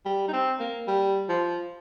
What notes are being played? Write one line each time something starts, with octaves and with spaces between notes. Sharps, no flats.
G3
D#4
C4
A#3
G3
F3